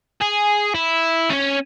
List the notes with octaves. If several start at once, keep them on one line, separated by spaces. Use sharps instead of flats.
G#4
E4
C#4